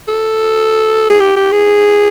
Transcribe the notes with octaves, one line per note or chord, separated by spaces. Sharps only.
A4
G#4
G4
G4
G#4